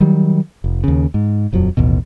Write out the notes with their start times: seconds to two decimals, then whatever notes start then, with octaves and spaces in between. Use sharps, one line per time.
0.01 D#3 F#3 G3
0.64 F1
0.84 D#2 C#3
1.14 G#2
1.53 D#1 F2 F3 F#3
1.77 A1 D#2 B2